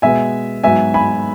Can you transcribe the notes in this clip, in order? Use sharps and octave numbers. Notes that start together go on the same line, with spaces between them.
B2 G#3 B3 E5 G#5
G#2 F#3 B3 E5 G#5
G#5 B5